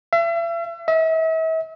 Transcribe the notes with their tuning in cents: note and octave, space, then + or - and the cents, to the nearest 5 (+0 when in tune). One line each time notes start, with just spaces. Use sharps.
E5 +40
E5 -40